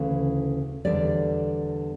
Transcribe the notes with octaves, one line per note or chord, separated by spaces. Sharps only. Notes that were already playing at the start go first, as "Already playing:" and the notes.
Already playing: D2 C#3 E3
E2 D3 G3 D5